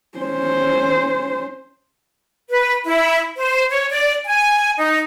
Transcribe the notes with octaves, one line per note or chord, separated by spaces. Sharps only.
C#4 C5
B4
E4
C5
C#5
D5
G#5
D#4